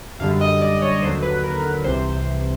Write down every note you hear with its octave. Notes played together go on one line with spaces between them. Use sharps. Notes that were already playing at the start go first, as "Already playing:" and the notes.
F#2 D3 G3 F5
D#5
D5
C#5
D#2 D3 F#3 C5
B4
A#4
A#4
C2 C3 E3 C5